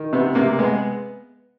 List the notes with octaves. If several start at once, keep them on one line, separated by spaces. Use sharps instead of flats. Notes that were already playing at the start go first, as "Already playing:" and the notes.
Already playing: D#3
C3 B3
C3 A#3
G#3 B3